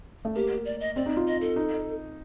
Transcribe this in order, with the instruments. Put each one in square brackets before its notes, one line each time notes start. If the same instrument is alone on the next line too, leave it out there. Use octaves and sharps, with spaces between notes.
[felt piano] A3
[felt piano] A#3 [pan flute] G4
[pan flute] D5
D#5
[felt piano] C4 [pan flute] D5
[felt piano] D#4
F4
[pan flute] D#5
A4
[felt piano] D#4